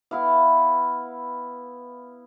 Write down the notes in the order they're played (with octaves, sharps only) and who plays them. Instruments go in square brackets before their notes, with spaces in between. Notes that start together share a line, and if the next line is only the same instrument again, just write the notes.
[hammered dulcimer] B3 E4 F5